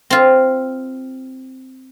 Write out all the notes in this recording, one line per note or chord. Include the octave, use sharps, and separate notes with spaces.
C4 F4